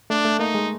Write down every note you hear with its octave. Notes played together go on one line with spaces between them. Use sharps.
A3 D4
A3
A#3 D#4
G#3